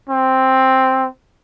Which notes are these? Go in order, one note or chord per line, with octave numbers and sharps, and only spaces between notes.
C4